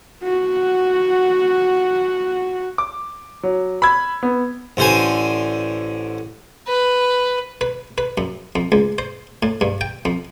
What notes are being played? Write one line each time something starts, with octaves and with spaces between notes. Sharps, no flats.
F#4 F#5
D6
F#3
B5 E6 G#6
B3
A1 D3 C5 G#5
B4
B4
B4
F#2
F2
C#2
C5
A2
G2
G5
F2